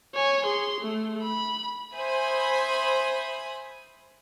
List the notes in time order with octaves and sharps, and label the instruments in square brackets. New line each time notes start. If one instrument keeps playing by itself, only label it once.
[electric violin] C#5 G#5
G#4 C6
A3
B5
[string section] C5 E5 G#5 B5 D#6